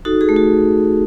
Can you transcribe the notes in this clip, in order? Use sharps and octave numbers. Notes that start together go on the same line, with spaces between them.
D#4 F#4 A4
G#4
A3
F#4